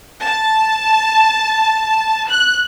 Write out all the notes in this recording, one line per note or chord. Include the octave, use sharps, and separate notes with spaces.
A5
F#6